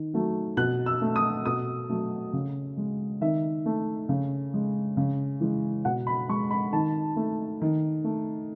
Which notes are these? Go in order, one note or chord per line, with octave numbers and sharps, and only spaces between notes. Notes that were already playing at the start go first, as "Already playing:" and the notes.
Already playing: D#3
F#3 A3
B2 F#6
E6
A3
D#6
B2 D#6
F#3 A3
C#3
G#3
D#3 E5
A3
C#3
G#3
C#3
E3 G#3
B2 F#5
B5
G#3 C#6
B5
D#3 A5
A3
D#3
A3